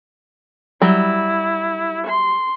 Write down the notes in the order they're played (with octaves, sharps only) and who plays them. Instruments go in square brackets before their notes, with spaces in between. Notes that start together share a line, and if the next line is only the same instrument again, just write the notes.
[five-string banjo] F#3 G3 [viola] E4
[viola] C6